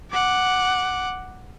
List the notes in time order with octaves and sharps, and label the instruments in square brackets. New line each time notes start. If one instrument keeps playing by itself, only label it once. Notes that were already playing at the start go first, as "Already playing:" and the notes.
[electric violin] F#5 D6